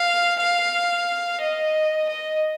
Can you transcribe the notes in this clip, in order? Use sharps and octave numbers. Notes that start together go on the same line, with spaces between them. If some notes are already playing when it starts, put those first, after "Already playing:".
Already playing: F5
F5
D#5
D#5